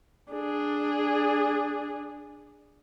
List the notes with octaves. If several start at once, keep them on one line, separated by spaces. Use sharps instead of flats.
D4 G#4